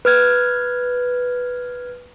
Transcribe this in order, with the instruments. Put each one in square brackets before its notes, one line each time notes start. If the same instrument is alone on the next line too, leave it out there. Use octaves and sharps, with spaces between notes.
[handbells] B4 F6 G#6